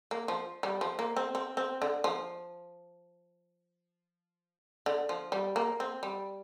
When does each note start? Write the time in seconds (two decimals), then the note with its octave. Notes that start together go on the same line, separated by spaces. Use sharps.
0.11 A#3
0.28 F3
0.63 G3
0.81 F3
0.99 A#3
1.17 C4
1.35 C4
1.57 C4
1.82 D3
2.04 F3
4.86 D3
5.09 F3
5.32 G3
5.56 A#3
5.80 C4
6.03 G3